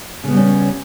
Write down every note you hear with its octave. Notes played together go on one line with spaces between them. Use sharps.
C#3 G3 B3 C#4